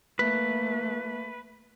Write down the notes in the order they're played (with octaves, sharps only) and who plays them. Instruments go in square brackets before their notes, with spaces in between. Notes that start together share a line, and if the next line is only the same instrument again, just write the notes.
[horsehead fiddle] A3 A#3 [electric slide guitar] B4